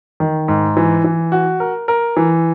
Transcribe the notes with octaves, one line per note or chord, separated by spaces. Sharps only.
D#3
G#2
E3
E3
F#4
A#4
A#4
E3